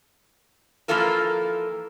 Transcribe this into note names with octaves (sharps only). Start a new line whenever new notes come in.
E3 F3 A#3 F4 A4 A#4